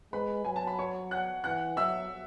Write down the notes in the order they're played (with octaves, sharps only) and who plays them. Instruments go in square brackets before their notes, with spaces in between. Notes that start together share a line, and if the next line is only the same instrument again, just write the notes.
[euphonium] G#3 [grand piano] B4 B5
[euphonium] F#3 [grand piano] G#5
[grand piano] A5
B5
C#5 C#6
F#5 F#6
[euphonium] E3 [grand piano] F#5 F#6
[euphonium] F#3 [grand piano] E5 E6